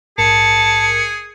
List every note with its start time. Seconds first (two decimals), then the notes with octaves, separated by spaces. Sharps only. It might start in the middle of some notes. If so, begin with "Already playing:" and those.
0.18 A#1 G#2 G#4 A#4 A5 C#7